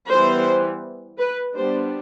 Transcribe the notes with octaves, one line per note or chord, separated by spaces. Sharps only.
E3 G3 B3 C5
B4
G3 B3 D4 C5